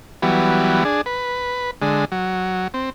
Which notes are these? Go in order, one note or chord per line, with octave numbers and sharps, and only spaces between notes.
E3 F#3 G3 B3
D4 G#4
B4
D3 G#3
F#3
C4